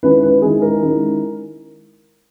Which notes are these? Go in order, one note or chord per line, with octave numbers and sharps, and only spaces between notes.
D#3 G#3 C#4 E4 B4
B4
D#3 G#3 C#4 E4 G#4
A#4
D#3 G#3 C#4 E4